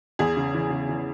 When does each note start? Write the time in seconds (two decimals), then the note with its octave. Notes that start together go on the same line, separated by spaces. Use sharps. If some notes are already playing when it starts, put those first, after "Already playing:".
0.19 E2 G#4
0.37 C#3
0.54 E3
0.70 C#3
0.89 E3